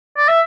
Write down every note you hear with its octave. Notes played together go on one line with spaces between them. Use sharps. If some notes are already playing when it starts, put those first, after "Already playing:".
D5
E5